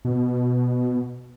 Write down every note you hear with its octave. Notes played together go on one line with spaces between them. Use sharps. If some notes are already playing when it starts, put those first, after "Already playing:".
B2